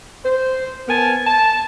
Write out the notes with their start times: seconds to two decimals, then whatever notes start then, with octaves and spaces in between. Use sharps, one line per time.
0.25 C5
0.88 B3 A#4 G#5 A5
1.27 A5